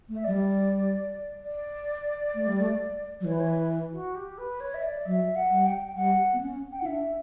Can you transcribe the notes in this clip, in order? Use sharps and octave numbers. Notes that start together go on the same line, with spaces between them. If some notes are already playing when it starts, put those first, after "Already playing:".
A3
E5
F#3 D5
G3
D5
A3
G3
A3
F#3
E3 C#5
B4
C#5
B4
F#4
G4
B4
C#5
E5
D5
F#3 E5
F#5
G3
G5
G5
G3 F#5
B3
C#4
G5
F#5
E4
D4 E5